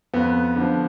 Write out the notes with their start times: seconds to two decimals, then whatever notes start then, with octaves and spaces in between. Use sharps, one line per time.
0.14 F2 B3
0.56 D3 F3